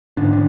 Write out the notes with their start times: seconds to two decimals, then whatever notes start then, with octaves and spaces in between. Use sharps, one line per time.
0.17 G#2 D3 D4
0.33 D3 D4